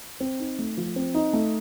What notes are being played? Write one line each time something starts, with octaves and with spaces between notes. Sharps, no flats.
C4
D#4
A3
F3
C4
D#4
A3